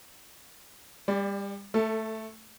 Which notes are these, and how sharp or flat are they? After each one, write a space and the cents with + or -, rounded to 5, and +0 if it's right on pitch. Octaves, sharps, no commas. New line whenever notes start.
G3 +30 D5 +0
A3 +0 A4 +25